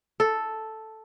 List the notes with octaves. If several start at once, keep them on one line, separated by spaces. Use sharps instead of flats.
A4